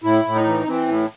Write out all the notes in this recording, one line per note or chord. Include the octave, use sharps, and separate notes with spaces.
A2 E4
A2
D#4
E3
E3 C4
A2